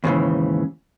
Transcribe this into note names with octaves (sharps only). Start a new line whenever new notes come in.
D#2 G#2 C#3 E3